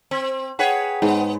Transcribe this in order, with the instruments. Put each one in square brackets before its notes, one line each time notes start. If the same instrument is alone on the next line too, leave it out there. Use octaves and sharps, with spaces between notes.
[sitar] C4
[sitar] G#4 B4 C#5 [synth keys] F#5 G5
[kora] G#2 [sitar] B3